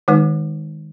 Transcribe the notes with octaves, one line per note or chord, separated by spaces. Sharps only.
D#3 G#3 D#4 B4